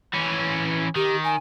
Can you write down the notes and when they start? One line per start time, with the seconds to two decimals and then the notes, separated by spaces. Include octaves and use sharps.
0.13 E3 C#4
0.96 D#3 G4
1.24 G#5